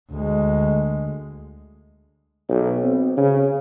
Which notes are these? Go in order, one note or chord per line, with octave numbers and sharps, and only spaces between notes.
D2 G#3
B1
C4
C#3